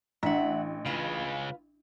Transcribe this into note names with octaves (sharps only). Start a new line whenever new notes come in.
A1 D4 E5 F#5
C#3 G#3 F4 B4